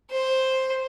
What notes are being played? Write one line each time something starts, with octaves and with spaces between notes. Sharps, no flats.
C5